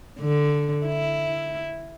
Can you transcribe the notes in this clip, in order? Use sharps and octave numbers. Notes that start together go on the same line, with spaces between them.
D3
E4